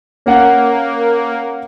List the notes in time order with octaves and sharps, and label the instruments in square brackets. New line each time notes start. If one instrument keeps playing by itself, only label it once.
[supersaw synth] A#3 [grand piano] C#4 F#5